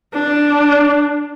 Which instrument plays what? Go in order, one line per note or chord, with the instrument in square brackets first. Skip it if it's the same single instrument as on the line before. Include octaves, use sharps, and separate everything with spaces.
[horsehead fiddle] D4